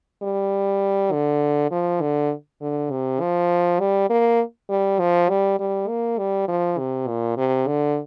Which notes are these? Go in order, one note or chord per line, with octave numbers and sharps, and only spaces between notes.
G3
D3
F3
D3
D3
C3
F3
G3
A#3
G3
F3
G3
G3
A#3
G3
F3
C3
A#2
C3
D3